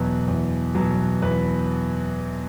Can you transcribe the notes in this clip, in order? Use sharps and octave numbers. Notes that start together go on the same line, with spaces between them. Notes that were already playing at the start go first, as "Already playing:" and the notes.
Already playing: E2 B2 F#3 B4
E2
B2 F#3
E2 B4